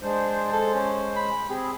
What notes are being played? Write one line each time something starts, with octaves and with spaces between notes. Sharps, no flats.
G#3 D4 C5
A4
C#4
B5
C4 G4 G#4